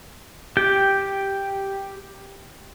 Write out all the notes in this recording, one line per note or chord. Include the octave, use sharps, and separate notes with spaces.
G4 G5